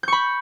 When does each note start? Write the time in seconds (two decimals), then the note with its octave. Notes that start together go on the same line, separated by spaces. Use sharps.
0.03 G6
0.08 C#6
0.12 B5